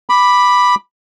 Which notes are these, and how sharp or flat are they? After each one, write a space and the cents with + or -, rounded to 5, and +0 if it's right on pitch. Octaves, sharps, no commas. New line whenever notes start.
B5 +0 D6 +10